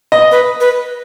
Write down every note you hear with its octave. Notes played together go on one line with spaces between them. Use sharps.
D#5
B4
B4